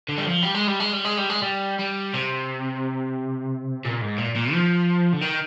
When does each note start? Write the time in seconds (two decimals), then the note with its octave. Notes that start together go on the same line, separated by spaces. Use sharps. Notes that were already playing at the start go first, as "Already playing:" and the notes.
0.08 D3
0.18 G3
0.26 F3
0.43 G3
0.55 G#3
0.68 G3
0.80 G#3
0.93 G3
1.05 G#3
1.18 G3
1.30 G#3
1.43 G3
1.79 G3
2.14 C3
3.85 A#2
4.02 G#2
4.18 A#2
4.36 A#2
4.53 F3
5.13 D3
5.21 D#3